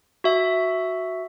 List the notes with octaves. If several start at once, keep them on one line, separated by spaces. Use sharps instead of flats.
F#4 E5